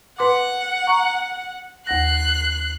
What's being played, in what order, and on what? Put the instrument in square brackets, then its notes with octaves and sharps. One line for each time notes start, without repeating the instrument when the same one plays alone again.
[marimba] B4 C6 D6 [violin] F#5
[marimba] A#5 C#6
[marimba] D#2 F#5 A#6 [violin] F#6 C7